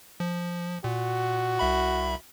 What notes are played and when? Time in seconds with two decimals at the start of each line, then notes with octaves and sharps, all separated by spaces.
0.20 F3
0.84 A#2 F#4
1.59 C2 E5 B5